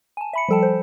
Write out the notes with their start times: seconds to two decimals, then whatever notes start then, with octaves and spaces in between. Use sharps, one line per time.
0.17 G#5 A5
0.33 E5 B5 C#7
0.49 F3 G3 A4 G5 A5
0.63 C5